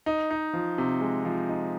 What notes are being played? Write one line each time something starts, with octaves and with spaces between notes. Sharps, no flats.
D#4
D#4
F3
C3
G#3
F3
D#4